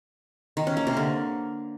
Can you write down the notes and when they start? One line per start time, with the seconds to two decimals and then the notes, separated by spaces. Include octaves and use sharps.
0.57 D#3
0.67 C#4
0.77 A#3
0.87 C3
0.97 D3